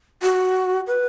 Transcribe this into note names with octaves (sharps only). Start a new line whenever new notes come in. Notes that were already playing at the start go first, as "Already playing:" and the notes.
F#4
B4